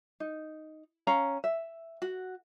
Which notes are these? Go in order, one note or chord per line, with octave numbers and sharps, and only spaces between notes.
D#4
C#4 F5 A#5
E5
F#4